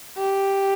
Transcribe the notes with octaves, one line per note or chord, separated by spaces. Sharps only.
G4